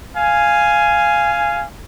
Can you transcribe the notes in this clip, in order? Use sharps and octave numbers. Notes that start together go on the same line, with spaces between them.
F5 G#5